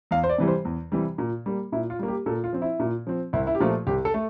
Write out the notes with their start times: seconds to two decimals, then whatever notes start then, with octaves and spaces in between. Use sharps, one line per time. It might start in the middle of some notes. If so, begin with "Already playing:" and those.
0.11 E2 F5
0.24 C5
0.29 D5
0.38 C3 E3 G3
0.48 C5
0.65 E2
0.92 C3 E3 G3
1.18 A#2
1.46 G3 A#3
1.72 A#2 E4
1.90 F4
1.99 G3 A#3
2.08 G4
2.26 A#2 A4
2.44 F4
2.53 F3 C4
2.62 E4
2.80 A#2
3.07 F3 C4
3.33 C2 E4
3.47 E4
3.55 G4
3.60 A#2 F3 A3 F4
3.87 C2 G4
4.05 A4
4.14 A3